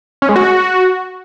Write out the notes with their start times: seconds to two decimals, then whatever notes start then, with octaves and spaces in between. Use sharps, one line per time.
0.22 C#4
0.29 G#3
0.36 F#4